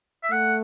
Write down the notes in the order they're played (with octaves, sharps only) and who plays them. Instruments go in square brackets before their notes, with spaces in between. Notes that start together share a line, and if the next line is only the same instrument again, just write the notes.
[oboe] E5
[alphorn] A3 [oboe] F#5